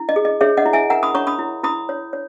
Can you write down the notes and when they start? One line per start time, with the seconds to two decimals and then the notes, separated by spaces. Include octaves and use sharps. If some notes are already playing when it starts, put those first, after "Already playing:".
Already playing: E4
0.09 D#5
0.16 G#4
0.25 D#5
0.41 G#4 C#5 E5
0.57 D#5 F#5
0.66 E4
0.73 E5 G#5
0.90 A#4 F#5 A#5
1.03 B5 D#6
1.15 C#5 A#5 C#6
1.27 B5 D#6
1.39 E4
1.63 E4 B5 D#6
1.89 C#5
2.13 C#5